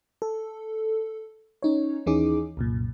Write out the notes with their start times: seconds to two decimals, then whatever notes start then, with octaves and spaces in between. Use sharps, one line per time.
0.22 A4
1.63 C#4 D#4 C#5
2.06 D#2 E3 C#4 D#4 G#4 D6
2.57 C2 F#2 A#2